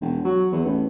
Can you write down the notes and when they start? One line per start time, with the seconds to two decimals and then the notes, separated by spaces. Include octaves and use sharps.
0.01 E1
0.25 F#3
0.52 E2
0.66 A1